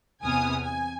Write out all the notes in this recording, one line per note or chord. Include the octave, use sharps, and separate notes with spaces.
E2 C3 B3 G#5 D#6 F6
G#5